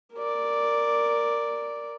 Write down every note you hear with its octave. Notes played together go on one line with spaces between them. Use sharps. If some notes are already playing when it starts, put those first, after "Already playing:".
A#4 D5